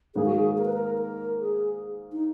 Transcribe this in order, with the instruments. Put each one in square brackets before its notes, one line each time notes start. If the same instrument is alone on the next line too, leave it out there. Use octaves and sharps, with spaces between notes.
[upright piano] G#2 D#3 A#3 [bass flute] G#4
[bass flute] F#4
G#4
A#4
B4
A#4
A#4
G#4
D#4